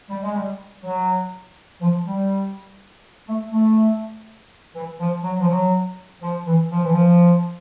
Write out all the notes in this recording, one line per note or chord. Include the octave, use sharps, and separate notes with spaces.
G3
G#3
G3
F#3
F3
G3
A3
A3
E3
F3
F#3
F3
F#3
F3
E3
F3
E3
F3